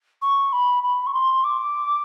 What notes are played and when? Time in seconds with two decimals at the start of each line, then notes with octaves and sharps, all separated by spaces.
0.22 C#6
0.52 B5
0.83 B5
1.07 C#6
1.13 C6
1.44 D6